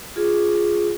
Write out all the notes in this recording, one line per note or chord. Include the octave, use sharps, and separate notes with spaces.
F4 G#4